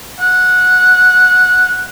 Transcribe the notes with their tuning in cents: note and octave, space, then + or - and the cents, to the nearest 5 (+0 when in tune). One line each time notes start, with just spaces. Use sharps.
F#5 -15